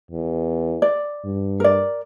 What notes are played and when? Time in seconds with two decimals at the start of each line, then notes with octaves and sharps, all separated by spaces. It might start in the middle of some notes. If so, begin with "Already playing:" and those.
0.11 E2
0.82 D5
1.24 G2
1.60 A#4 D5